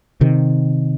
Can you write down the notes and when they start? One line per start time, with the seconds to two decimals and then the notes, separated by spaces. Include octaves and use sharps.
0.21 C3 D#3